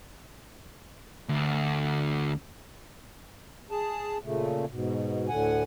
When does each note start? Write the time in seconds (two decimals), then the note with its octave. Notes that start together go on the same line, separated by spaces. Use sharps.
1.29 D2
3.71 G#4 A5
4.24 A#2 C#3 A3
4.71 G#2 B2
5.29 D2 A2 D3 F#5 G#5